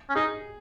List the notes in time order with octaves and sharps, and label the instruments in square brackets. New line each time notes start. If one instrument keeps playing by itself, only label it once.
[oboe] C#4
[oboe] D#4 [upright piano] G#4